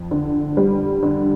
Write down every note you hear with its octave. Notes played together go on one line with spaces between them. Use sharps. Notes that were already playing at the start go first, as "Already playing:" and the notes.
Already playing: F2
D3
G3
D3